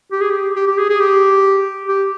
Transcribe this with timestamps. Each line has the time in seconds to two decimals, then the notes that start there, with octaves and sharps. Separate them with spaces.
0.12 G4
0.21 G#4
0.30 G4
0.56 G4
0.67 G4
0.78 G#4
0.89 G#4
1.00 G4
1.88 G4